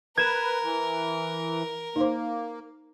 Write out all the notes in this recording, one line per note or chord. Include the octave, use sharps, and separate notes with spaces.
A#4 B4 G#6 E7
E3
A#3 D#4 C5